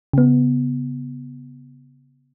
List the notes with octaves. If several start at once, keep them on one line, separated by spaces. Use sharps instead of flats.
C#3 B3